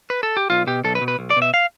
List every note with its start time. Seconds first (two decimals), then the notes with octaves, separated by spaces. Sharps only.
0.10 B4
0.23 A4
0.37 G4
0.50 B1 F4
0.67 B2 G4
0.84 B1 A4
0.95 B4
1.01 B2
1.08 B4
1.19 B1
1.30 D5
1.36 B2
1.42 E5
1.54 F5